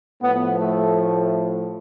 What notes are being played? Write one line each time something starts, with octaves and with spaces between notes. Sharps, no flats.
A2 F3 B3
A3